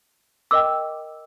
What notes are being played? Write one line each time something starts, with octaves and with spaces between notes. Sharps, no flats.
A#4 D#5 G5 D6 E6